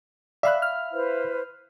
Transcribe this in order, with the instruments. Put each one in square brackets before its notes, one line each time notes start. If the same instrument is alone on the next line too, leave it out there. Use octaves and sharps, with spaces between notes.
[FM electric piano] D5 E6 F#6 [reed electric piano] E5 F5 B5
[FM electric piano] F6
[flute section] E4 B4 C5